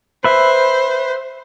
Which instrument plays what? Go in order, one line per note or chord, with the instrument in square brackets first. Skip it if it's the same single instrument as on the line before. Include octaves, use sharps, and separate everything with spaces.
[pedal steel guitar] B4 E5 [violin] C5